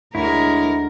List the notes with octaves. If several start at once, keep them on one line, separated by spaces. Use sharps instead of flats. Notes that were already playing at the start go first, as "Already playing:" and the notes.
D2 G#3 E4 A#4 C#5